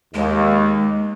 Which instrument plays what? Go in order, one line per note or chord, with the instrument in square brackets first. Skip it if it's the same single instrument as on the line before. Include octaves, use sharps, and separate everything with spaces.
[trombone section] D#2 [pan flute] G#3